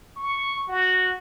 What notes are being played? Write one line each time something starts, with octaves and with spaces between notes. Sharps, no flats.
C#6
F#4